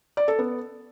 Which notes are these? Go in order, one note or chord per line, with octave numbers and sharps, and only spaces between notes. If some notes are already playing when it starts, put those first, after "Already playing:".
D5
A4
B3